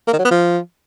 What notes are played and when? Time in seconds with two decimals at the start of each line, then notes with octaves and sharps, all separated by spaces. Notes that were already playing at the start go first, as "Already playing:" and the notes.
0.07 A#3
0.13 D#3
0.19 F#3
0.25 B3
0.31 F3